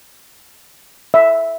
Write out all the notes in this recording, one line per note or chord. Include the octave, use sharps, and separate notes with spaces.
E5